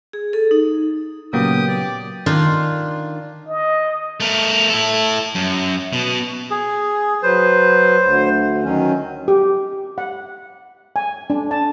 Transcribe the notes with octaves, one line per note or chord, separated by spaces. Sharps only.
G#4
A4
D#4
A#2 C#3 F#3 A#3 B3 G4 D#6
D5
D#3 D4 D#4 F4
D#5
A3 A#4
E4 A4
F#2
B2
G#4
F#3 B4 C5
D2
D#3 F#3 C#4
G4
F#5
G#5
D4
A5